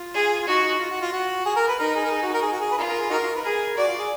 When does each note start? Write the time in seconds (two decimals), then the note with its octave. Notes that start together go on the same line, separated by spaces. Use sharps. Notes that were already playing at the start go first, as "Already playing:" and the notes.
Already playing: F4
0.14 G#4
0.42 F4
0.47 D#4 F#4
0.79 F4
0.91 F#4
1.02 F4
1.13 F#4
1.46 G#4
1.56 A#4
1.68 B4
1.79 D#4 A#4
1.96 G#4
2.05 A#4
2.11 G#4
2.23 F#4
2.34 A#4
2.42 G#4
2.52 F#4
2.61 G#4
2.72 B4
2.78 F4 A#4
2.89 A#4
3.00 G#4
3.10 D#4 F#4 A#4
3.35 B4
3.44 G#4 A#4
3.77 F#4 D5
3.88 F4
3.99 G#4